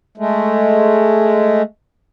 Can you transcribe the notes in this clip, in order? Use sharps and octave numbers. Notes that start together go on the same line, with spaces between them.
G#3 A3